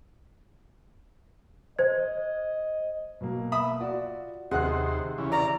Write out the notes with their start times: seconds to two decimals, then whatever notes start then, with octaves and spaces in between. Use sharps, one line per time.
1.79 C5 D#5 G#6
3.21 B2 F#3 A#3
3.52 E5 B5 D#6
3.80 F4 F#4 D5
4.51 D#2 C3 G#4 C5 D#5 F#5 F#6
5.18 C#3 E3
5.32 D5 A#5